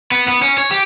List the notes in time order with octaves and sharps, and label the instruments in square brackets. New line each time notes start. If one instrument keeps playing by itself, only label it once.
[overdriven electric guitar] B3
B3
C#4
C#5
G4